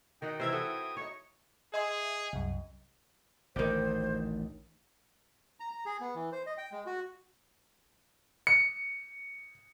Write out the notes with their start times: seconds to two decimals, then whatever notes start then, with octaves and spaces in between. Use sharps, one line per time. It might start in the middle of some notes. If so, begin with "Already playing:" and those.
0.22 D#3 D#4 F#4 F#5 G5
0.40 C3 E3 A#4 C5 E5 G#6
0.52 F#4 A4 B4 D#6
0.97 D#4 C#5 C#6
1.74 G#4 D#5 E5 C6
2.33 C2 F#2
3.56 A1 D2 A#2 D#3 G4 C5
5.60 A#5
5.71 A#5
5.86 G#4
6.00 B3
6.15 E3
6.32 C5
6.46 D#5
6.58 G5
6.72 G#3
6.87 F#4
8.47 C#7